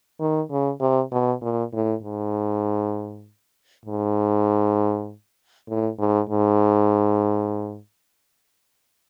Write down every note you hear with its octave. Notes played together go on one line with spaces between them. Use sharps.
D#3
C#3
C3
B2
A#2
A2
G#2
G#2
A2
G#2
G#2